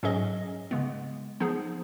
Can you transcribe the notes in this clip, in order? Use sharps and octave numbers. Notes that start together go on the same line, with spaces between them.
G#2 F#3 C#4 G#4 D#5
C#3 G#3 B3
F3 B3 D#4 G#4